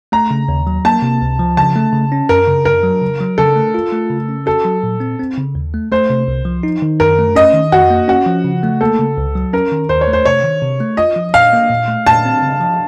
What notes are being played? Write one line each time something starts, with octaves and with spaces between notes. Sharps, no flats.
A3 A#5
C#3
D#2
F#3
A#3 A5
C3
C#2
F3
C#3 A5
A3
C#3
C#4
F#2 A#4
C#3
F#2 A#4
F#3
C#3
F#3
C#3 A4
A3
F4
A3
C#3
C#4
F#4 A4
F#3
A#2
C4
C4
C#3
D#2
A3
A3 C5
C3
C2
F3
D#4
D#3
F#2 A#4
A3
C#4 D#5
D#3
F2 F#4
A#3
C#4 F#4
F3
C#3
A3
A#3 A4
C#3
C#2
F#3
C#4 A#4
D#3
D#2 C5
C#5
A3
C5
C3 C#5
D#3
C3
A3
F4 D#5
F3
A#2 F5
A#3
A#2
A3
A#2 A5
C4
C#3
F3